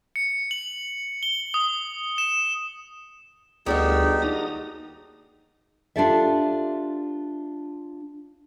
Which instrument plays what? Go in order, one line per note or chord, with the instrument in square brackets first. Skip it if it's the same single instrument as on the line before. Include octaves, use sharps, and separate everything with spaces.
[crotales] C#7
F#7
G7
D#6
E7
[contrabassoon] G1 [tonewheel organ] D2 E6 [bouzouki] G#3 D4 F#4 [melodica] D#4 G4
[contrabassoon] D#2 [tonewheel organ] A#5 D#6
[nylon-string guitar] D4 F4 G4 A4 D5 E5